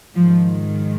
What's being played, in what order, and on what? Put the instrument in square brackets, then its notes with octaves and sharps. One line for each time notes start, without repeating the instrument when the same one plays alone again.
[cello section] G#2 D#3 F3